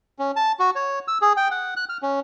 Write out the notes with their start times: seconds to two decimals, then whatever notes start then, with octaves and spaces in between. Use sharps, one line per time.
0.19 C#4
0.36 A5
0.59 F#4
0.76 C#5
1.08 E6
1.22 G#4
1.37 G5
1.51 F#5
1.76 F#6
1.89 F6
2.02 C#4